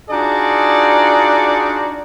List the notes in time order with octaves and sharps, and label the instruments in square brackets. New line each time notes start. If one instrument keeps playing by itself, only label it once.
[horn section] D4 D#4 F4 F#4 G#4 D5